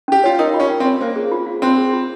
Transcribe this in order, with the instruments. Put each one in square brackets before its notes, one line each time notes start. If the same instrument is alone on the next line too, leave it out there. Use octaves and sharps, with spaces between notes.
[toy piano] C#4 [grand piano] G4
[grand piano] F4 [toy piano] C#5
[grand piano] D#4 [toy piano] A#4
[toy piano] F4
[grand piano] C#4
[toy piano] C#4
[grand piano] C4
[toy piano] C#5
[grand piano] A#3 [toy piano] C5
[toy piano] G#4
F4
F5
[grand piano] C4 [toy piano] C5
[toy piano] G#4
F4